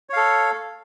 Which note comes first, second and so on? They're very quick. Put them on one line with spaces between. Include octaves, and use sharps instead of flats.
C#5 F5 A4